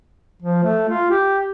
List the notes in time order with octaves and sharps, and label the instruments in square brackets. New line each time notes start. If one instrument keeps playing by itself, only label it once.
[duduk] F3
A3
F4
G4